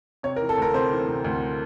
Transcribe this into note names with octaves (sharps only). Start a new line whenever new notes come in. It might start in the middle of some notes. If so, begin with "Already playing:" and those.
C3 C#5
A#4
E3
A4
D2 A#4
C3 C5
E3
C3
D2